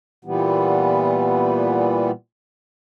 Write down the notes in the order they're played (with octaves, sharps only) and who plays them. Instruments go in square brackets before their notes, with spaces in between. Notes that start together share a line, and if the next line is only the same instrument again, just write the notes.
[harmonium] A#2 E3 G3 B3